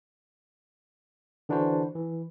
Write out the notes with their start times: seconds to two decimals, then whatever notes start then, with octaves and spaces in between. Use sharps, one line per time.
1.49 D3 E3 D4 E4 F#4 C5
1.95 E3